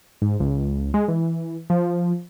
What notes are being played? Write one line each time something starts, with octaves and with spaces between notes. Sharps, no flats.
G#2
C#2
G#3
E3
F3